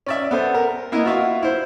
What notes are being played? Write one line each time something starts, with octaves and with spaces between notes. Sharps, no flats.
C#4 D5 E5
B3 A4 C5
A#4
A#3 B3 E4 D#5
F4 F#4 E5 F5
E4 C5